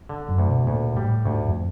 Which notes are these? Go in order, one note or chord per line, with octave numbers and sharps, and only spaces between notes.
D3
F#2
D2
B2
D2 A#2
A2 G3
D2 G#2
F2